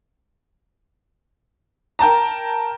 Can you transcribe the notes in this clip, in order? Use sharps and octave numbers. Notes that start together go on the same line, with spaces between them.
A#4 G5 A5 A#5